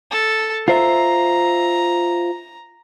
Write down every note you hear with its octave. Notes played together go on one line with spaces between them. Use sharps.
A4
F4 C5 E5 A#5